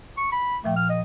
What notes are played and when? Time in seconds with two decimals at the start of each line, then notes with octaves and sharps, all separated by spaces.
0.17 C#6
0.32 B5
0.64 A#2 F3 A3 G5
0.76 F6
0.89 D#5